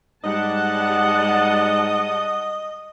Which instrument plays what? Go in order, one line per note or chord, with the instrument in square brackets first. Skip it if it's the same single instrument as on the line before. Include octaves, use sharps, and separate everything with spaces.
[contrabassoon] G#2 [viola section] G3 F#5 A5 [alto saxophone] D#5